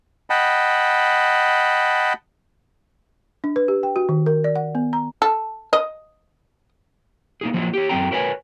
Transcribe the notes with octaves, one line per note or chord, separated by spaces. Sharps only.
D#5 F#5 G5 A5 B5
D4
B4
G4
G5
F#4
D#3
A#4
D5
F#5
B3
A#5
A4
D#5
A#3 D#4 G#4
F3 F#3 A#3 F4
G4 C#5
F#2 F#3 C4 A4 G5 A#5
F#4 A#4 B4 C#5 G#5